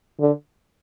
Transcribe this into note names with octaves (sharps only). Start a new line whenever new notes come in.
D3